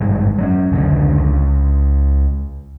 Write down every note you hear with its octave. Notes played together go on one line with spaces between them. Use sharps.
G#1 G2 G#3
F#3 C4 C#4
F1 C#2 D3
C#2